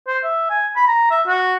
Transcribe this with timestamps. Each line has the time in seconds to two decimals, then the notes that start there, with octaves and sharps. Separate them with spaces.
0.07 C5
0.24 E5
0.50 G#5
0.76 B5
0.87 A#5
1.11 E5
1.27 F#4